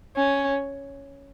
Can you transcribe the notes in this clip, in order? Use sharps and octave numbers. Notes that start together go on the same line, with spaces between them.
C#4